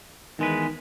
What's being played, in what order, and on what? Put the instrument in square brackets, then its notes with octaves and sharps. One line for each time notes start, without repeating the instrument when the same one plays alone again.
[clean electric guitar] E2 G#3 B4 [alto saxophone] D#3